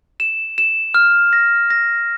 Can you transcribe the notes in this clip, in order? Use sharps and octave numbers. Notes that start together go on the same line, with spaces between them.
E7
E7
F6
A#6
A#6